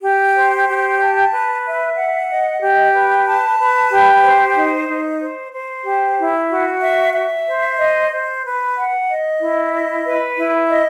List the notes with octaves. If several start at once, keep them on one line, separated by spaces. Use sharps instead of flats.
G4
C5
G4
A5
B4
E5
F#5
D#5
G4
B4
A5
B4
G4
C5
D#4
D#4
C5
C5
G4
E4
F#4
E5
E5
C5
D#5
C5
B4
F#5
D#5
E4
D#5
B4
E4
D#5